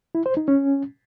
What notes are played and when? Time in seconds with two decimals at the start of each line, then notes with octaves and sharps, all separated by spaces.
0.15 E4
0.26 C5
0.37 D#4
0.48 C#4